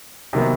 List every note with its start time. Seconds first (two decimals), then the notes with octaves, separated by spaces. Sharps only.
0.33 C3 D#3 F#3 B3